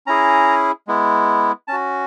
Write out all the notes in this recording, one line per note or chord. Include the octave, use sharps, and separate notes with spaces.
C#4 E4 G#4 A#5
G#3 B3 E4
C#4 F#4 A5